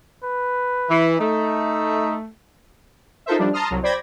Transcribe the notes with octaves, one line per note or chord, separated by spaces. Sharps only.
B4
E3
A3 D#4
D#4 F4 A4 A#4 C5 E5
F3 G3 D4
A5 A#5 C6 D#6 F6
C2 F#3
C5 D5 G5 B5 G#6 A#6